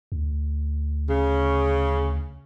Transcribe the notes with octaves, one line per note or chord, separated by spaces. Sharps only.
D2
C#3